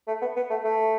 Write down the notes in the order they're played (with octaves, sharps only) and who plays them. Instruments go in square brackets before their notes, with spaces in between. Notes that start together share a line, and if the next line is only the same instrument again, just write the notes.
[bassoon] A3
B3
B3
A3
A3